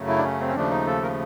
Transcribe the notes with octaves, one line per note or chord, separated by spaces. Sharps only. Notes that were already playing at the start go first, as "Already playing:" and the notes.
Already playing: F#2 C#3 F#3 A3
E4
D4
C#4
C4
C#4
D#2 C#3 F3 A3 D4
D#4
A4
A#4